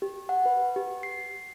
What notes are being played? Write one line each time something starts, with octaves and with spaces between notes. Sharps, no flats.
G4
F#5
B4
G4
C7